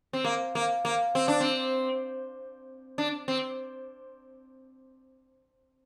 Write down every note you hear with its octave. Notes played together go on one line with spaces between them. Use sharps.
C4
A#3
A#3
A#3
C4
D4
C4
D4
C4